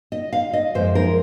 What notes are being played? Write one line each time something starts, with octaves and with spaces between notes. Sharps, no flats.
D#5
F5
D#5
F#2 F3 G#3 C5
A#4